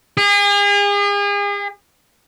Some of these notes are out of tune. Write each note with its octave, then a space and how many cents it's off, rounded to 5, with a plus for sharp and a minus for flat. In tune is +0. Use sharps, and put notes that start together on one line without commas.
G#4 -40